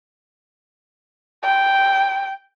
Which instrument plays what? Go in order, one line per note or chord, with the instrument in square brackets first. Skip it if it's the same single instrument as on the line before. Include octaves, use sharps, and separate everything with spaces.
[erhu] G5